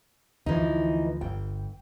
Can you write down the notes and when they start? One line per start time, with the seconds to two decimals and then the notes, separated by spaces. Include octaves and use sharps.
0.46 D2 E3 F3 D#4
1.21 G1 G5